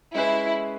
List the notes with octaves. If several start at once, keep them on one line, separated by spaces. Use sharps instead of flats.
G#3 C#4 E4 G#4 B4